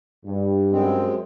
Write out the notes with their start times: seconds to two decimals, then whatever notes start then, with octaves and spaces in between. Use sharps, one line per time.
0.24 G2
0.72 F#2 G#3 C4